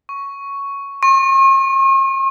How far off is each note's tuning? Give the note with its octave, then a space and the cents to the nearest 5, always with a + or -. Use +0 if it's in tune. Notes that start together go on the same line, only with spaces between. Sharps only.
C#6 +5
C#6 -45